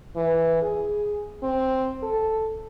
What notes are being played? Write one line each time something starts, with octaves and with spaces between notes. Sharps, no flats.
E3
G#4
C4
A4